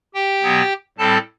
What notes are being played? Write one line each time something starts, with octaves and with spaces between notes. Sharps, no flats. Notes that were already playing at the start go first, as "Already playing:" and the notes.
G4 G5
B2 F#3 B3
A2 G3 C4 A4 A5